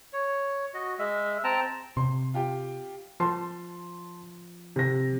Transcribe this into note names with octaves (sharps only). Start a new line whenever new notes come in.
C#5
F#4 D#5
G#3 E5
C4 G5 A5 A#5
C3 C6
F4 G4 G5
F3 A5 C6
C3 A#6